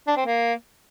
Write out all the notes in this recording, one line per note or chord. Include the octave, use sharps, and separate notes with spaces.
D4
C4
A#3